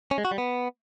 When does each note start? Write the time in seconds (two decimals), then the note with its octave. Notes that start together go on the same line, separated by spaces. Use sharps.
0.11 C#4
0.18 G#3
0.25 F#4
0.31 G3
0.38 B3